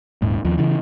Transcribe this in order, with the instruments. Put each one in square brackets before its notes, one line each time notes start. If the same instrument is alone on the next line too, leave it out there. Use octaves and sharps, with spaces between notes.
[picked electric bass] D#1 G#2
D#2 F3
C#3 E3